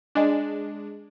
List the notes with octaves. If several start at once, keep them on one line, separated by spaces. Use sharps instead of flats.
G#3 D4